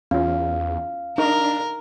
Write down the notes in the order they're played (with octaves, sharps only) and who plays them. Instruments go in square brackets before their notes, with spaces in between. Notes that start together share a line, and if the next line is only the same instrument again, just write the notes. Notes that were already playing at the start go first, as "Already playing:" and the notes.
[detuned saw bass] E2 [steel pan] C#4 F4 [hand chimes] F5
[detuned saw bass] D4 [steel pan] D#4 [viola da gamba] A#4